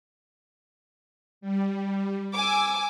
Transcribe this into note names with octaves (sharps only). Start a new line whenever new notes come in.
G3
G#5 D6 E6